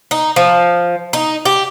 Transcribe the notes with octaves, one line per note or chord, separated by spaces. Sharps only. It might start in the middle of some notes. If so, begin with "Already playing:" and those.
D#4
F3
D#4
G4